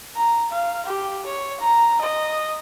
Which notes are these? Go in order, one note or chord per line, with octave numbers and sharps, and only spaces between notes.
A#5
F5
G4
C#5
A#5
D#5